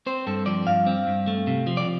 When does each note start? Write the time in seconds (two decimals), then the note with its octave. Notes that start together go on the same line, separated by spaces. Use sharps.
0.06 C4 C5
0.27 G2 A4
0.46 F3 D5
0.67 G2 F5
0.87 C4
1.07 G2
1.27 A3
1.47 C3
1.67 F3
1.77 D5